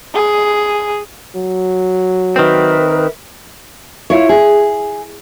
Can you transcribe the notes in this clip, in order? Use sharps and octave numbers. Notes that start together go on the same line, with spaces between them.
G#4
F#3
D#3 C4 A#4 B4 E5
E4 F4 C#5
G#4